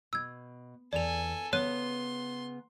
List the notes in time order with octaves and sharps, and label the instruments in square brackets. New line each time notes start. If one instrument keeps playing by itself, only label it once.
[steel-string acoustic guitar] B2 [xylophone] E6 G#6
[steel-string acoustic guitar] E2 [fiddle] A4 G#5 [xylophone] D5 F7
[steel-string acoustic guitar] C#3 B3 [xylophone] C#5 F#6 D#7 [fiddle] C6